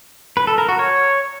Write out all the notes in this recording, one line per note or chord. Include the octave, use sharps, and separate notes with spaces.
B4
A4
A#4
F#4
C#5